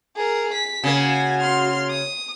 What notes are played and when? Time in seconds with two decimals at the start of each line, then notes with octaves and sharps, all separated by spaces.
0.16 G#4 A#4
0.54 B6
0.84 C#3 A#3 F#4 G#5
1.41 C6 F6
1.90 D#6